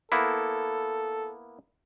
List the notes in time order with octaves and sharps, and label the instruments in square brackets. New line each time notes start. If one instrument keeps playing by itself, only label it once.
[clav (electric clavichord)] A#3 B3 E4 [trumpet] A4